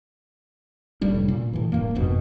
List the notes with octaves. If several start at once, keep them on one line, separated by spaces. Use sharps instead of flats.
F1 A2 G3 D4
A#2
A2 E3
D1 G2 A#3
F#1 F2 G#2 B2